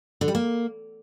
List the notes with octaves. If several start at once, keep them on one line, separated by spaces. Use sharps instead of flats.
D3
G3
A#3